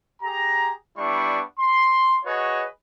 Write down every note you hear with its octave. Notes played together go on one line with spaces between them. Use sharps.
G4 G#4 A#5
G3 B3 D4 E4 C#6
C6
F#4 G#4 B4 C#5 D#5